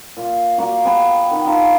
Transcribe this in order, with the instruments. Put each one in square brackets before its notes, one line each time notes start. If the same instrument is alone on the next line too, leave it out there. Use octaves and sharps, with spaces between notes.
[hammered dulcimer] A#2
A#3 F#4 D5
B3 G5 G#5
D#3
D4 D#4 F4 A5